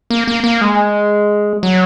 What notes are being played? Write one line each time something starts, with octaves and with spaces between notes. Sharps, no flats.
A#3
A#3
A#3
G#3
F#3